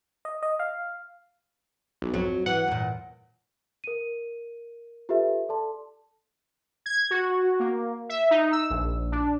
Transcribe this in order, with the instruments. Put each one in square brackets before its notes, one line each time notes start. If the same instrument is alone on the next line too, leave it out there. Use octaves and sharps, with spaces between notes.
[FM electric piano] D#5
D#5
F5
[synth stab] B1
[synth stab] F2 [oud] F#3
[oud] E3 [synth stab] F#5
[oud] E2 A#2
[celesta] A#4 D#7
F4 G4 A4 B4 E5
A4 D5 A5 C6
[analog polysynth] G#6
F#4
A#3
E5
D#4
E6
A#1
D4